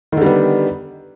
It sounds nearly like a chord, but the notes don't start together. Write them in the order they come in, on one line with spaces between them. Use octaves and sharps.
D#3 D3 G3 B3